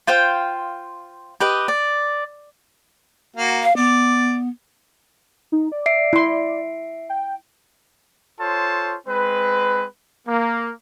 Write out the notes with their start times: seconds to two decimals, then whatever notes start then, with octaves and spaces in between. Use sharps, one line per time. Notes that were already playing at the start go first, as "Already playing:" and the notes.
0.07 F4 C5 F5 G5
1.40 G4 B4 D#5
1.68 D5
3.37 A#3 F#4
3.63 F5
3.77 B3 D5
5.52 D#4
5.72 D5
5.86 E5 C7 D7
6.13 E4 C6
7.09 G5
8.40 F4 A4 C5 C#5 A5
9.07 G#3 C4 B4
10.27 A#3